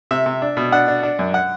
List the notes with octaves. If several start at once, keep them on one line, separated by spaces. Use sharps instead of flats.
C3 E5
C3
D4
B2
D4 F#5
D4
D4
F#2
F#5